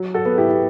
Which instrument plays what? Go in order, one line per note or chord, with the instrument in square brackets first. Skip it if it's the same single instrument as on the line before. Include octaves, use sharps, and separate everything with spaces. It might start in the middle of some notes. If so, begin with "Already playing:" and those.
Already playing: [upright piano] F#3
F#4 A4
B3
E4 G4